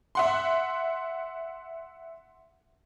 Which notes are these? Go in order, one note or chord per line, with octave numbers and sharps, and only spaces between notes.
E5 F#5 C6